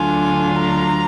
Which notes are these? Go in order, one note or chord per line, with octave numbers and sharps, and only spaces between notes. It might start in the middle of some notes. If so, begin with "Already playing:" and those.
Already playing: D2 D3 F#3 D4 F4 G#5
A#5